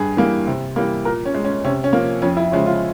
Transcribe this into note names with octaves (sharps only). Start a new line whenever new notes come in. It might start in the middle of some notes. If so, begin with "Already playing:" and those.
Already playing: G2 G#4
E3 G3 A#3
C3
E3 G3 A#3
A#2 A#4
C#4
G#3
C#4
C3 C#4
C#4
F3 A#3
F2 C#4
E4
C#3 F3 G#3 C#4
F4